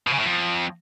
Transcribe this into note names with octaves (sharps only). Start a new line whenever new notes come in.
B2
C#3
A2
F2